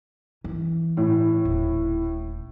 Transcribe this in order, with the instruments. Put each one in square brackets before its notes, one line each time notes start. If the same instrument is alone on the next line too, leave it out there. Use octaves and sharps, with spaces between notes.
[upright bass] E3
[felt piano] A2
[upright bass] D#1